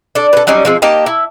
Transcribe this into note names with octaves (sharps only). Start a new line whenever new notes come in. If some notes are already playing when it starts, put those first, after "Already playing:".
D4 A4
A4 B4
F#3 G3 C#4 D#4
F3 G#3 C4
A#3 D#4 G4 A5
E4